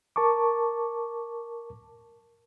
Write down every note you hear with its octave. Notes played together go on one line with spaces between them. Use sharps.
A#4 A5 C#6 D6